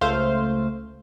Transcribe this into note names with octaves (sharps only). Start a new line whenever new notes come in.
C#2 A3 C5 F5